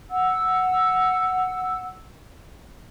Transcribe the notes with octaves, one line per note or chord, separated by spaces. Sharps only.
F#5 E6